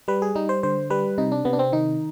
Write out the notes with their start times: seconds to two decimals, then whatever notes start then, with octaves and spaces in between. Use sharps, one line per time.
0.08 G3 B4
0.22 G#4
0.35 G3 D#4
0.49 C5
0.63 D3 C5
0.90 G3 B4
1.18 C3 D#4
1.32 D4
1.45 C3 B3
1.53 D4
1.59 C4
1.72 D#3 D#4